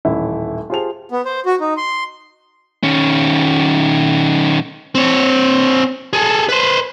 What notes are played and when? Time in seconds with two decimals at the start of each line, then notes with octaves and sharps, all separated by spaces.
0.05 D#1 A1 E4
0.70 F4 G4 G#4 C5 A5 F7
1.11 B3
1.25 C5
1.46 F#4
1.60 D#4
1.77 C6
2.83 D#3 C#4
4.95 C4 C#5
6.13 G#4 A4
6.49 B4 C5